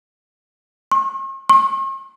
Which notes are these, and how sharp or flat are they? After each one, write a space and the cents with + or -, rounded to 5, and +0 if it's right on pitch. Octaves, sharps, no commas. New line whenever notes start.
C#6 -45
C#6 -45